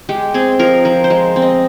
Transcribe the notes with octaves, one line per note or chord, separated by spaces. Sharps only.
G#3 G4
C4 G#4
F3 A#4
F3 A#4
C5
G#3
C4
D#5